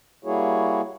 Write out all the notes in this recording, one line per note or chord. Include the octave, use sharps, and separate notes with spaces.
G3 A#3 E4 F#4 G#4 C#5